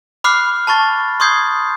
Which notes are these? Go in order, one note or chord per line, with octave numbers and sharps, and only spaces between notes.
B5 D6 F6 F#6 C7
A5 B5 C#6 A6
C6 C#6 D#6 G6 G#6 C7